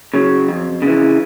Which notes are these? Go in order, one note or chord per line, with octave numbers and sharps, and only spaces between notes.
C#3 F#3
F2
C#3
E3